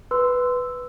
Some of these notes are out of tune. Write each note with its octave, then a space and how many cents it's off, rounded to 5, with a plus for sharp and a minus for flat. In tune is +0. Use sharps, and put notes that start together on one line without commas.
B4 +0 C6 -15 E6 +0